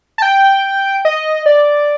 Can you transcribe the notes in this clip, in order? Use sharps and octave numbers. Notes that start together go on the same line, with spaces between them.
A5
G5
D#5
D5